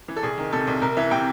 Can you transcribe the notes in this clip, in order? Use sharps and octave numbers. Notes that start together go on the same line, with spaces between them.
E3
A4
C2 G#4
D#3
C3 A4
C2
C2 A#4
E3 E5
C3 G5